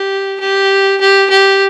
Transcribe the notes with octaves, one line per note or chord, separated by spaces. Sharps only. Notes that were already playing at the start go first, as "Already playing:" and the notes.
Already playing: G4
G4
G4
G4